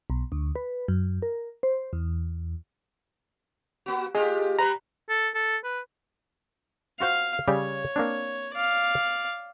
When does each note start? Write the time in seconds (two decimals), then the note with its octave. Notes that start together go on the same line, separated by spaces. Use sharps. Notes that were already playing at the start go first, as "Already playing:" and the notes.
0.10 B1
0.32 D2
0.56 B4
0.88 F#2
1.22 A#4
1.63 C5
1.93 E2
3.86 A#3 F#4
4.15 A3 F4 G4 G#4 D#5
4.59 G3 B4 A#5
5.09 A4
5.35 A4
5.64 B4
7.00 F4 F#4 C5 F5
7.48 C#3 G3 G4 C#5
7.96 A#3 C4 D4
8.54 D5 F5